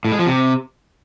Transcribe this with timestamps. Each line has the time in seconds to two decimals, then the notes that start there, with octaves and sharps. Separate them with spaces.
0.05 A2
0.12 G#3
0.19 F3
0.26 C3